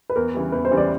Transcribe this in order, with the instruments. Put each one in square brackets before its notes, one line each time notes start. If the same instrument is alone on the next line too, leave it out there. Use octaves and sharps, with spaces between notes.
[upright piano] B4
[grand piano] E2 [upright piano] A#4
[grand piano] C#3 E3 G3
[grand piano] E2 [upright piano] B4
[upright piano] C5
[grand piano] C#3 E3 G3
[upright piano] D5